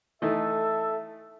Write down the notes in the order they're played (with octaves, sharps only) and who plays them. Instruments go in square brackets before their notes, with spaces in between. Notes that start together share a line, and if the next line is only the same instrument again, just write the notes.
[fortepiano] E3 A3 D#4 [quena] A4 [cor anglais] E5